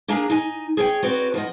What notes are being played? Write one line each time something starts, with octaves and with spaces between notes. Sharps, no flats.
A#3 D4 G#4 G#5 A#5
D#4 G#5
G#4 C#5 G5
C4 F#4 B4 C#5 D5
F3 B3 D#5